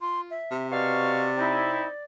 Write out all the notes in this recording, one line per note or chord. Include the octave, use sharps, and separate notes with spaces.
F4 C6
E5
C3
B2 D5 F5 C#6
C4 D#4 E4